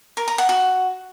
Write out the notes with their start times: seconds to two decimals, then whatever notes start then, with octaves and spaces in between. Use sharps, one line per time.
0.17 A#4
0.28 A#5
0.38 F#5
0.49 F#4